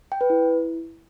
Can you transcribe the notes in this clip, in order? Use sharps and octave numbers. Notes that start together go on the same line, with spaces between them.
G5
B4
E4